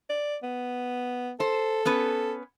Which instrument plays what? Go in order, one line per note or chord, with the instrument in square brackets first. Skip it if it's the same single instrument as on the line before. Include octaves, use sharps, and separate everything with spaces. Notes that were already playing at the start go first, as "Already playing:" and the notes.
[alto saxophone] D5
B3
[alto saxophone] A4 [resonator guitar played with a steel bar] C5
[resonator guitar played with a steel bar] B3 C#4 B4